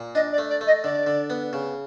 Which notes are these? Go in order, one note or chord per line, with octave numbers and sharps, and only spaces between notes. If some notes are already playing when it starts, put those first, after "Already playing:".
Already playing: A#2
D4 D#5
D5
A3
D5
A3
D#5
D3 D5
D3
B3
C#3